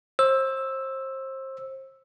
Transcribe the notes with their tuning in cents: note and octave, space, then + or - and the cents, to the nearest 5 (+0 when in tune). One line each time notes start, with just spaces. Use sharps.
C5 +30 E6 +0